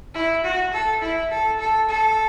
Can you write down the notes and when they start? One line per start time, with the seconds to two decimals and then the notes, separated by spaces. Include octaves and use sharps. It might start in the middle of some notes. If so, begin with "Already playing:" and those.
0.14 E4
0.44 F#4
0.73 A4
1.01 E4
1.31 A4
1.59 A4
1.89 A4